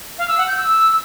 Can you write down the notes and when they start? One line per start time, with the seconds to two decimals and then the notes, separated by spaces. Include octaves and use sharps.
0.18 F5
0.28 E6
0.38 F#5
0.48 G6
0.57 E6